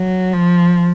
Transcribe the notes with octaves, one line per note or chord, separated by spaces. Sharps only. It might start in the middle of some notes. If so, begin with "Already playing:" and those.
Already playing: F#3
F3